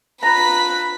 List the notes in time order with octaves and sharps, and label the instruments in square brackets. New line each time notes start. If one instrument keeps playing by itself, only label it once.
[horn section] D4 F4 B4 [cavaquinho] A#5 [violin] B5 B6